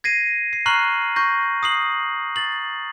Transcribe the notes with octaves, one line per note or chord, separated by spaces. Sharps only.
G#6 A#6 C7 D#7
C7
A#5 C#6 F6 F#6 C7 F#7
C#6 G6 A#6
D#6 C7 F#7
A6 F#7